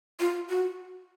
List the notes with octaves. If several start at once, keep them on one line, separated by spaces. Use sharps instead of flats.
F4
F#4